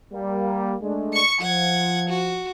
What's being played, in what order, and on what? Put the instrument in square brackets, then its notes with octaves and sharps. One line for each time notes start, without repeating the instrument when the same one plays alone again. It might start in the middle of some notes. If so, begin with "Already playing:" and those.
[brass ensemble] G3 A#3
G#3 A3 D4
[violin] C#6 C#7
[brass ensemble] F3 [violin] F#5 G#6
[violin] F#4